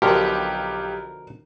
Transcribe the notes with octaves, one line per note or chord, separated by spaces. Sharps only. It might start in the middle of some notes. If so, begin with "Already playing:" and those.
B1 B2 D3 F3 G4 A#4